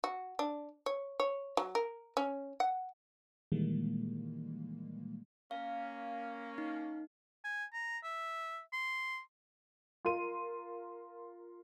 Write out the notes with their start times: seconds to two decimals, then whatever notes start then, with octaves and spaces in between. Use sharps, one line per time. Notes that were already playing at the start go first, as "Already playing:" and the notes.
0.04 F#4
0.39 D4
0.86 C#5
1.20 C#5
1.57 F#3
1.75 A#4
2.17 C#4
2.60 F#5
3.52 A#2 D#3 E3 G3 G#3 A#3
5.51 A#3 C#4 F5
6.58 D#4
7.44 G#5
7.73 A#5
8.03 E5
8.73 C6
10.05 F4 A#4 C6 D#7